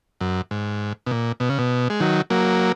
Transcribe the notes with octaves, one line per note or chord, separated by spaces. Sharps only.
F#2
G#2
B2
A#2
B2
C#3
B2
G#3
D#3 F#3
F#3 A#3